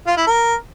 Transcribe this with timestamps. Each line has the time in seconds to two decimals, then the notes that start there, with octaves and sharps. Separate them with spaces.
0.07 F4
0.17 E4
0.27 A#4